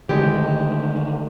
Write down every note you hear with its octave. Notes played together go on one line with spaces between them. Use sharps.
D3 D#3 G#3 A3 G4